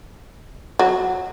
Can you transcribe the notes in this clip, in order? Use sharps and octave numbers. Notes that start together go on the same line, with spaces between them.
F#3